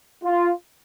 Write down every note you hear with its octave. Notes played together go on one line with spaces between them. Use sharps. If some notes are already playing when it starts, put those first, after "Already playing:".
F4